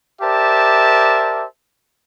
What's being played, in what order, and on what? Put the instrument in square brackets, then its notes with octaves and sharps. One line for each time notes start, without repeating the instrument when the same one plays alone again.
[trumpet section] G4 A#4 C5 D5 E5 A5